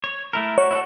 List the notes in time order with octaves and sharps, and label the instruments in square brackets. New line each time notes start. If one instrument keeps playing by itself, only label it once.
[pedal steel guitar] C#5
A3 E4 A#4
[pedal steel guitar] F#4 [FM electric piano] C#5
[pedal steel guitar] E4 F#4 A4